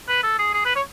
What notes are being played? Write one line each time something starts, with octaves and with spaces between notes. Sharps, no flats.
B4
A4
G#4
G#4
B4
C#5